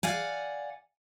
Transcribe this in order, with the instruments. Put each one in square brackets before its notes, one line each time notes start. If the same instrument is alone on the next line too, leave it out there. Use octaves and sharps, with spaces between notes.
[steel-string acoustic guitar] D5 F5 F#5 G#5